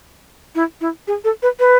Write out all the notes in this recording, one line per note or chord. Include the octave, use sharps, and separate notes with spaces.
E4
E4
G#4
A4
B4
B4